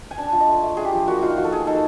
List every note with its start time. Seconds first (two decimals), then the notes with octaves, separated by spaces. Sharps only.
0.11 G#5
0.18 D4 A5
0.33 F4
0.40 D#5
0.47 A3
0.62 A3
0.77 D4 G#4
0.85 G4
0.93 F3
1.08 A#3 F#4
1.22 D#4 F4
1.37 F3 F#4
1.44 A4
1.52 A#3 G#4
1.67 D#4 A4